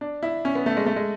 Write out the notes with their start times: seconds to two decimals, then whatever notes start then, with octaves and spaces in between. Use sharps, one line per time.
0.01 D4
0.23 E4
0.45 C#4
0.55 B3
0.66 A3
0.77 G#3
0.86 A3
0.96 G#3